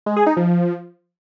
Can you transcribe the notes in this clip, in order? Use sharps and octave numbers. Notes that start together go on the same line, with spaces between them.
G#3
G#4
D#4
F3